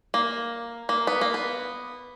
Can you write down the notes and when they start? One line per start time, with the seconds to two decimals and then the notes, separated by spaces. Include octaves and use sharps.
0.14 A#3
0.89 A#3
1.07 B3
1.21 A#3
1.34 B3